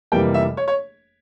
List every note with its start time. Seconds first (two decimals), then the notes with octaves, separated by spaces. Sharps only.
0.12 F1 F2 E3 G3 A#3 G5
0.34 E5
0.57 C#5
0.68 C#5